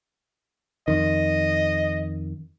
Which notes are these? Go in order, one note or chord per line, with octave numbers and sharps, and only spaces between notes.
F2 D#3 D#5